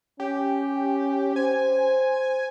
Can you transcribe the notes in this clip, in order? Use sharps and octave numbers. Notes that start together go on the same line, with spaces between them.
C#4 G4
C5 G#5